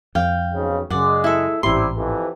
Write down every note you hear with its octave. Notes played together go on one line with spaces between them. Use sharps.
F2 F5 G5
B1 G#2 C#3
F#2 C#3 G#3 D5 F#5
E4 A4
A1 G#2 C3 G3 E4 C6
F2 C3 E3